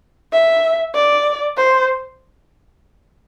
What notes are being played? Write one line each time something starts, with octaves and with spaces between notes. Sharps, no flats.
E5
D5
C5